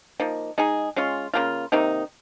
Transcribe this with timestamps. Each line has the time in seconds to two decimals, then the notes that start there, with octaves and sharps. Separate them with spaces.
0.20 F3 A#3 D#4
0.58 G#3 D#4 G#4
0.96 G#3 C#4 F4
1.33 C#3 F#3 A#3 F4
1.72 C3 D#3 A#3 D#4